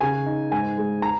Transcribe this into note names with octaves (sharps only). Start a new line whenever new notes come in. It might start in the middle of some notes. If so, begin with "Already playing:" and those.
C#3 G#5
D#4
G#2 G#5
G#3
A#5